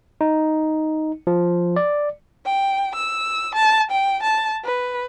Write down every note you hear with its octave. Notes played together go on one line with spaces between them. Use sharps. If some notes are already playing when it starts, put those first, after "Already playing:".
D#4
F3
D5
G5
E6
A5
G5
A5
B4